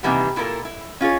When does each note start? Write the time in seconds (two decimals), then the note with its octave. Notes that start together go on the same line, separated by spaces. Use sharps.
0.03 C3 D#3 E3 G3 A#3 B3
0.36 A#2 E4 F4 A4 A#4
0.65 E4
1.01 C#4 F4 G#4 C#5